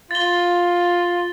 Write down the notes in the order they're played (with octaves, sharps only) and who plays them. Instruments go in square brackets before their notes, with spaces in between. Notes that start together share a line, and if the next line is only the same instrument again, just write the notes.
[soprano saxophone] F4 [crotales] A6 G7